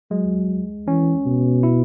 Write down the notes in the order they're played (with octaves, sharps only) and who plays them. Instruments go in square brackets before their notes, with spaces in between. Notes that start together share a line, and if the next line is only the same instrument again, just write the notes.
[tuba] F#3 [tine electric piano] G#3
[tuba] E3 [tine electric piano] C#4
[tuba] B2
[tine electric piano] E4